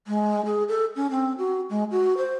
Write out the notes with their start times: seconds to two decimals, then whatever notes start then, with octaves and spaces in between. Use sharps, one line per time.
0.07 G#3
0.45 G#4
0.69 A4
0.96 C#4
1.11 C4
1.38 F#4
1.70 G#3
1.91 F#4
2.17 C5